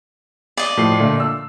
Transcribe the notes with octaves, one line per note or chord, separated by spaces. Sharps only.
D5 D#5
A2 F3 C7
A#2 D3 A3
E6